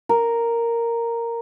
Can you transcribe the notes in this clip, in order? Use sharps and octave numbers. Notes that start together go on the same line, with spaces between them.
A#4